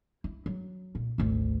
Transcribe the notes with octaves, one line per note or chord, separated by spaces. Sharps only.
E4
F#3
A#2
G#1 D2